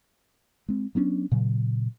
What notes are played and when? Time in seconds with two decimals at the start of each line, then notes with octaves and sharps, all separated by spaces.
0.69 G#3 C4
0.95 F#3 B3 C#4 D4
1.32 A#2 C#3 F#3